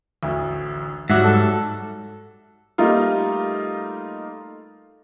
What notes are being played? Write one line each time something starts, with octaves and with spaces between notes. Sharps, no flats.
A1 D2
G#2 F#3 G3 F#4 E5 F#5
A4
G3 A3 A#3 D#4 F4